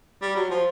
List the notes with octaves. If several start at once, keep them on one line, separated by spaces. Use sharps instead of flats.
G3
F#3
F3